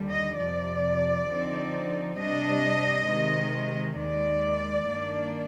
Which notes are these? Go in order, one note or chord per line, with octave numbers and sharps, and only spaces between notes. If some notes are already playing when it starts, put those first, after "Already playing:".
Already playing: D#2 D3 G3
D#5
F2 C3 F3 D5
D3 F3 C4 D#4
C3 G3 D4 D#5
C3 D#3 G#3
D#2 D#3 G#3 D5
G2 D#3 A#3 D4